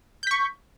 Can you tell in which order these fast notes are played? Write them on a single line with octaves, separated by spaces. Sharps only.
G6 B6 C#6